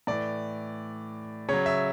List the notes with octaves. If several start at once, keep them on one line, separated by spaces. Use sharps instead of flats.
A2 E3 D5
C#3 F#3 C#5
E5